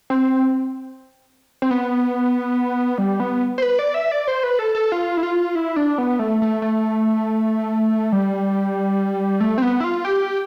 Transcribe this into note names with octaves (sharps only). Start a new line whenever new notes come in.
C4
C4
B3
G3
B3
C5
B4
D5
E5
D5
C5
B4
A4
A4
F4
E4
F4
E4
D4
B3
A3
A3
A3
G3
A3
C4
B3
E4
F4
G4